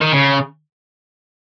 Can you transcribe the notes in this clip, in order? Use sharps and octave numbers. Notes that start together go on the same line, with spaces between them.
D#3
C#3